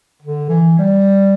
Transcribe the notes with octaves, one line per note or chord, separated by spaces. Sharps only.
D3
E3
G3